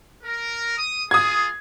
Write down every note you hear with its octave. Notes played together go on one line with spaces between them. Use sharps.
A#4
D#6
F4 G#4 D#6 G#6